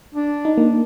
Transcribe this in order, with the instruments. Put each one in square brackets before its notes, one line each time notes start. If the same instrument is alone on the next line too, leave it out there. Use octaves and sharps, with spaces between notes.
[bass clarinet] D4
[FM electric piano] D#4
A#3